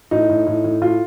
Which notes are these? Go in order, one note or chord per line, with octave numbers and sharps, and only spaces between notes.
A2 D#4
A2
A2
A2
A2 F4